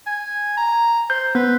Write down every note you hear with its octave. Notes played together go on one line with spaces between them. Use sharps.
G#5
A#5
C5 G6
B3 B4 G6